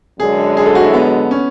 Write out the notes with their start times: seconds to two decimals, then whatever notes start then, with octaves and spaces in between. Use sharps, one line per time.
0.20 F#2 D3 G#3 G#4
0.57 G#4
0.66 A4
0.75 F#4
0.84 E4
0.94 B3
1.31 C#4